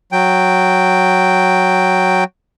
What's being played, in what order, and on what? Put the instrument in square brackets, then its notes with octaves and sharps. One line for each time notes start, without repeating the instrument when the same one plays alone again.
[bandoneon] F#3 G5